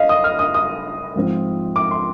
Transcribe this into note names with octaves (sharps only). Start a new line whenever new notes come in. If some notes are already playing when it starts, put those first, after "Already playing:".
Already playing: D#5 F5
D#6
F6
D#6
D#6
G#2 F3 C4
D6
C6